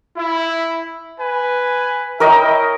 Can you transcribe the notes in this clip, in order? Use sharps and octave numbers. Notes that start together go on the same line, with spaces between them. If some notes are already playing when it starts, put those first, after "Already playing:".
E4
B4 G#5
E4 A#4 C#5 D#5 E5 G5